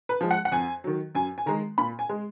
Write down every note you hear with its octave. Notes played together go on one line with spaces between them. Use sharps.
B4
F3 G#3
F#5
F#5
F2 G#5
D#3 F#3
F#2 G#5
G#5
D#3 G#3 A#5
A#2 B5
G#5
G#3